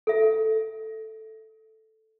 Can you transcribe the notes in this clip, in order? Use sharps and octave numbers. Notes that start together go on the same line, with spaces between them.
A4 E5